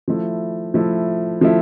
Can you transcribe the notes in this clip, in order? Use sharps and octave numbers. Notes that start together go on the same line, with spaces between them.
F3 A3 E4
F3 A3 E4
F3 A3 E4